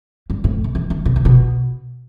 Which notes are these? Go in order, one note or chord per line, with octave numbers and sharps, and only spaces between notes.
G2
A2
C3
E3
D#3
B2
C3
B2